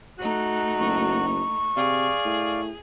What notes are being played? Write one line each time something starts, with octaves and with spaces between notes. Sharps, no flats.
A3 D#4 F#4 F#6
F#1 C#6
C3 G#4 D5 F5
A2